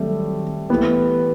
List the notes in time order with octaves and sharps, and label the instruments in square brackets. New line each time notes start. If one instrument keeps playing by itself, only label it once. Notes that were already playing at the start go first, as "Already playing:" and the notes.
Already playing: [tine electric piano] D#3 F#3 C4 [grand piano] G3 A3
[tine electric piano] E3 A3 E4 G4 [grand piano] B3